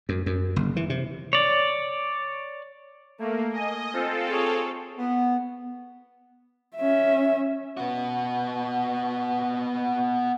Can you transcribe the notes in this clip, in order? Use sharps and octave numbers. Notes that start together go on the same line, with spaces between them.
F#2
F#2
F#1
E3
C3
C#5 D5
A3 A#3
D#5 G#5
C4 F4 A4
G#4 C#5
B3
C#4 E5
B3 F#4